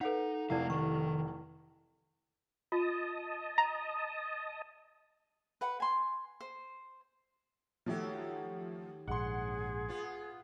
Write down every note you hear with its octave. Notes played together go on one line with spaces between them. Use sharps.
D#4 A4 B4 C#5 F5 F#5
F1 C3 A3 E4 A#4 D5 F5
D#3 C#6
F4 D#5 A5 D#6
A#5
B4 F#5
G#5 C6
C5
D#2 F3 F#3 A3 G4
A#1 G#2 G#4 F#5 C6
B3 F4